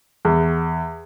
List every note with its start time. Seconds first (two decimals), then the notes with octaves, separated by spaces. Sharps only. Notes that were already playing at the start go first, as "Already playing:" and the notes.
0.25 E2